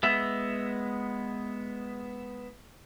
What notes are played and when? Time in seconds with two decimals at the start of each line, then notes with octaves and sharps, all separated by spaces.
0.03 G#3 B3 E5